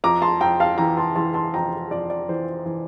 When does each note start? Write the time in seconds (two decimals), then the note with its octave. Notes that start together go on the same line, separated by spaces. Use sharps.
0.04 F2 A#5 D6
0.22 A5 C6
0.41 F2 G5 A#5
0.60 F5 A5
0.78 E3 G5 A#5
0.97 A5 C6
1.16 E3 A5 C6
1.34 A5 C6
1.54 F2 G5 A#5
1.91 F2 D5
2.10 D5
2.28 E3 C5
2.65 E3